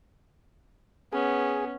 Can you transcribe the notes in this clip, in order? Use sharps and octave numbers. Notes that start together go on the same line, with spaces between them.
B3 C#4 G#4